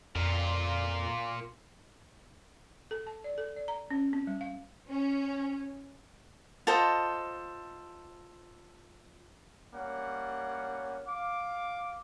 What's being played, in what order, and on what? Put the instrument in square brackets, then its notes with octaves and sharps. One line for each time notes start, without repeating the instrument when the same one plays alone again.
[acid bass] F2 [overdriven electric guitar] A#2 F4
[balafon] A4
A5
D5
A4
D5
A#5
C#4
C4
G3
F5
[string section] C#4
[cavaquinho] F4 A4 C5 D#5
[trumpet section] G3 A#3 C#4 C#5 F#5
F5 D6